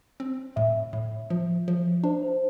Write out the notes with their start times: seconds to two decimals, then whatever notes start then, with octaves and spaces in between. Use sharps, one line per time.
0.20 C4
0.56 A2 E5
0.93 A2
1.30 F3
1.68 F3
2.03 D4 C5
2.22 C5